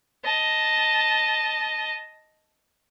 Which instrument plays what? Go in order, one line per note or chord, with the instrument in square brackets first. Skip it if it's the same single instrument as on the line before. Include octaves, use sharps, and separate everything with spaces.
[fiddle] D#5 A5